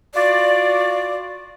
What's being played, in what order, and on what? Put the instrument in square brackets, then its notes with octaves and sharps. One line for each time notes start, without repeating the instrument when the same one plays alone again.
[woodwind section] F4 F#4 D5